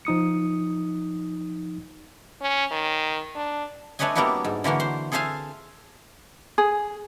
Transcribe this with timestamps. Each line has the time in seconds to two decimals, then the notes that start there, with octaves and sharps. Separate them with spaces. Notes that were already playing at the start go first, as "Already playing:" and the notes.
0.05 F3 D#4 D#6 C#7
2.41 C#4
2.71 D#3
3.35 D4
3.99 A3 D4 B4 C#5 D#5 G#5
4.15 G3 A#3 B3 D4 E4 F#4
4.44 G#2
4.64 D3 E3 A#3 F#4
4.80 C5
5.12 G#4 A4 C5 E5 F5 G#5
6.58 G#4